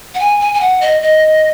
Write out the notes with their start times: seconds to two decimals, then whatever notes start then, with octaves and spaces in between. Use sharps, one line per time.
0.14 F#5
0.20 G#5
0.41 G#5
0.54 G#5
0.61 F#5
0.81 D#5
1.02 D#5